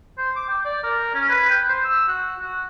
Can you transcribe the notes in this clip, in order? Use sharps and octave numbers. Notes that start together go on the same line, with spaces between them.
C5
D6
G5
D5
A#4
C#4
B4
G5
C5
E6
F#4
F#4